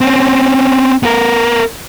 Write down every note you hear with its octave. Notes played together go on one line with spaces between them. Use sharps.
C4 C#4
B3 A#4